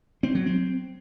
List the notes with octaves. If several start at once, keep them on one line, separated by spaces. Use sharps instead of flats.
C4
F#3
C4